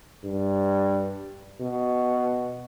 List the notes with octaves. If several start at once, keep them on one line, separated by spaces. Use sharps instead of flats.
G2
B2